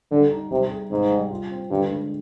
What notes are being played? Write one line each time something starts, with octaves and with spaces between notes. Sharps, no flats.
D3 G3
D#4
C3 G3
G#4
G#2 C3
G3
F4
C4
G2 D3
G#3